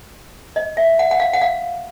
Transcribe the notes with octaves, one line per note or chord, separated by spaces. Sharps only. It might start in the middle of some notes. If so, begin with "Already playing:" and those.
D#5
E5
F#5
F#5
F5
F#5
F5